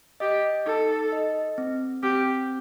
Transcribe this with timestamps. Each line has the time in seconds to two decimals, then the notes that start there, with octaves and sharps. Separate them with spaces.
0.20 G4 D#5
0.66 D#4 A4
1.12 D#5
1.58 C4
2.03 C4 G4